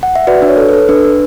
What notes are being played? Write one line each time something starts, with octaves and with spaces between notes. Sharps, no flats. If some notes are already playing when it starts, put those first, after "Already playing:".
F#5
E5
F#4 B4 D5
D4
C#5
A4
B4
A4
D4 B4
D4